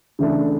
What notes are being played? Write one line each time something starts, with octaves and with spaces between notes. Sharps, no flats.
C#3 E3 A3 D4